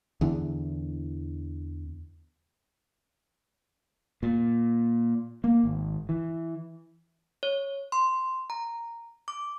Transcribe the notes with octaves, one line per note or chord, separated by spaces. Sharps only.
E2 D3 E3
A#2
A#3
G#1
E3
C#5
C6
A#5
D6